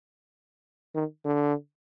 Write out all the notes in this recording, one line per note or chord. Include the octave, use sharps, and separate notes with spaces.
D#3
D3